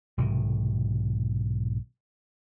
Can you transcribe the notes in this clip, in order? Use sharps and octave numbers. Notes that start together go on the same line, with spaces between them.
B1 G#2 C3 D#3